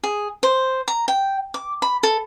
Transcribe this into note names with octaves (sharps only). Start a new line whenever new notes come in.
G#4
C5
A#5
G5
D6
B5
A4